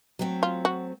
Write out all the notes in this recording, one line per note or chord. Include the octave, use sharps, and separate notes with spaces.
F#3 A3 C4
F4
F#4